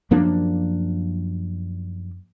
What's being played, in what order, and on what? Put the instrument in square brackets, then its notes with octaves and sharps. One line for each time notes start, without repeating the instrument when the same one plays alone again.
[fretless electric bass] F#2 F3 A#3 D4